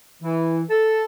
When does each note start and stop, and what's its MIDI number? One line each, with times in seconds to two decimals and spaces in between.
0.23 0.62 52
0.70 1.04 69